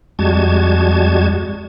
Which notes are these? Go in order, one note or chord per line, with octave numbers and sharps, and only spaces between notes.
F2 G3 G#3 F#4 A5 G#6